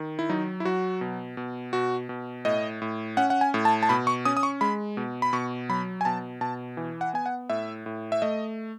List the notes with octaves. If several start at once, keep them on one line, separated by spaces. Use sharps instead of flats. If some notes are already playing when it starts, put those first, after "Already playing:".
Already playing: D#3
E4
F#3 D#4
E4
F#3 F#4
B2
B2
B2 F#4
B2
A2 D#5
A2
C#4 F#5
F#5
G#5
A2
A5
A5
B2 B5
C#6
C#4 D#6
D#6
C#6
G#3 B5
B2
B5
B2 C#6
F#3 B5
G#5
B2 A5
B2 A5
E3
F#5
B3 G#5
F#5
A2 E5
A2
E5
A3 D#5